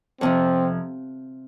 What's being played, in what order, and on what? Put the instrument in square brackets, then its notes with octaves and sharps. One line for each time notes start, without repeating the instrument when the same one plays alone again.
[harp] F2 C3 F3 [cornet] C4